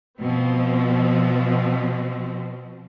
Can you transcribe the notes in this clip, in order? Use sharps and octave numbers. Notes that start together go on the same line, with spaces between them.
B2 F3 C4